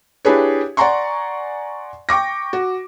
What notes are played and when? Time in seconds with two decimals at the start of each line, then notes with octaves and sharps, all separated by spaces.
0.25 D4 E4 G4 G#4 B4 C#5
0.77 D5 F#5 G#5 A#5 C6 C#6
2.09 G5 C#6 D6 A#6
2.53 F#4